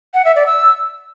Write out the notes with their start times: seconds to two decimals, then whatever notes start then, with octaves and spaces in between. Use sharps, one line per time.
0.14 F#5
0.25 E5
0.36 D5
0.46 E6